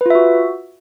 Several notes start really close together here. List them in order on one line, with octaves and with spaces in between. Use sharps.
B4 F4 E5 F#4